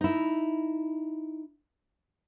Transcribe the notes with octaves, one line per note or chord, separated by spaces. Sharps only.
D#4 E4